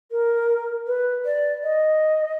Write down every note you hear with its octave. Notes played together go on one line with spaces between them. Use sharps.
A#4
B4
D5
D#5